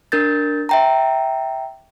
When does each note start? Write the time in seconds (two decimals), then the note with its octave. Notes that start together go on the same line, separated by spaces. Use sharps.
0.12 D4 A#4 G6 A6
0.69 E5 G5 A#5